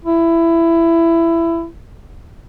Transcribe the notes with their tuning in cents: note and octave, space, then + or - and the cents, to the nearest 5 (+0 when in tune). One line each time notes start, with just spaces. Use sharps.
E4 +15